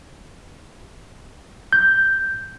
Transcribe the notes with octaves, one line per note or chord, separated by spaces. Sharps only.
G6